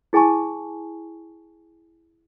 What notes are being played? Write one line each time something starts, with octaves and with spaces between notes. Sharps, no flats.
E4 G#4 G#5 A5 C#6